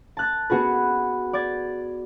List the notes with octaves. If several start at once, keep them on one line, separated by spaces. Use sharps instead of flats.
A5 F#6 A6
B3 F#4 G#4 B4
D5 D6 G#6 A6